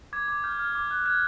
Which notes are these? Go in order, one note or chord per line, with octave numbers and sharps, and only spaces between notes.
D6 G#6
D6
F6 G6
F6
D6
F#6
F#6 G#6